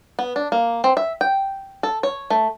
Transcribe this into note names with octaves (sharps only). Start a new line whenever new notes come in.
B3
D4
A#3
C4
E5
G5
A4
C#5
A3